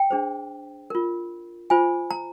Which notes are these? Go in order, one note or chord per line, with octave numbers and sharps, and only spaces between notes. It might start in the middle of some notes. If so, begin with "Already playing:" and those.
Already playing: G5
D4 G#4 C5
F4 A#4
F4 C5 G#5
A#5